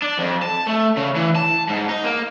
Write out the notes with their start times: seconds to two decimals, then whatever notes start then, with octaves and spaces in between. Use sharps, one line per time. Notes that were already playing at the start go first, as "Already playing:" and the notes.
0.02 D4
0.18 F2
0.42 A5
0.67 A3
0.97 C#3
1.15 E3
1.35 A5
1.69 G#2
1.89 D#4
2.04 A#3